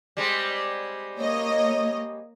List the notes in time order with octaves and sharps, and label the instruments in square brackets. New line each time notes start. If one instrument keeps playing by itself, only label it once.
[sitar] G3 G#3 C4
[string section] A#3 C#5 D#5